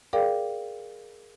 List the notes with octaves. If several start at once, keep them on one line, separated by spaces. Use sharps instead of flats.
G#4 A#4 D5 F5 G5 D6